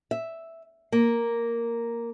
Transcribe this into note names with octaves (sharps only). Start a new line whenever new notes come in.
E5
A#3